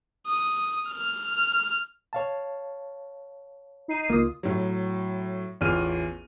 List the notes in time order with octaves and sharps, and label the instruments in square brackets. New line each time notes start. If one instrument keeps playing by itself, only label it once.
[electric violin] D#6
F6
[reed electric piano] C#5 F5 A5
[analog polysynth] D#4 C7 D#7
[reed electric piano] C#2 F4 D#6 [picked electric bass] A#3
[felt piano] A2 F#3
A1 E2 F4 F6 D#7